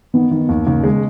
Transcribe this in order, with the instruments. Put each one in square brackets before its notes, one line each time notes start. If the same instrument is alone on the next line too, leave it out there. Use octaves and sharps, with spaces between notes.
[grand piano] D#3 [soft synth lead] B3
[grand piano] D#3
D#2
[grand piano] D#2 [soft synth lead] C#3
[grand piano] G#3